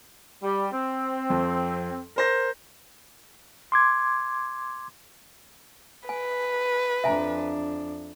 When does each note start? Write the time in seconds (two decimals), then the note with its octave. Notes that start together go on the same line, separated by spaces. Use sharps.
0.43 G3
0.73 C4
1.30 F2
2.16 A#4 C5 A#6
3.72 C6 D6 G#6
6.09 B4 G#5
7.04 F2 D4 E5 G#5 A#5